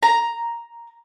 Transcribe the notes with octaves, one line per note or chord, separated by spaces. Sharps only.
A#5